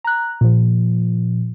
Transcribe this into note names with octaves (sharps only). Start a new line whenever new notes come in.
A#5 F#6
A#2 F3